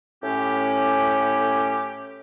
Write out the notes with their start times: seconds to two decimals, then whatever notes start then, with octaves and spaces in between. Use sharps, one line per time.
0.23 A2 C#4 G4